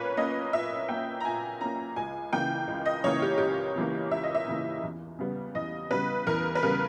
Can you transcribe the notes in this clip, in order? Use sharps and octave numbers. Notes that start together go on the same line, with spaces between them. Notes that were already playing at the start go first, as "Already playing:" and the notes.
Already playing: A#2 A#3 C#4 B4 C#5
A#3 C#4 D#5
A#2 E5
A#3 C#4 G5
A#5
A#2 G#5
A#3 C#4 A#5
C#2 G#5
C#3 E3 A#3 G5
C#2
D#5
C#3 E3 A#3 C#5
G4
C#2 G4
C#3 E3 A#3
C#2 E5
D#5
E5
C#3 E3 A#3
E2
C#3 G3 B3
E2 D#5
C#3 G3 B3 B4
E2 A#4
B4
C#3 G3 B3 A#4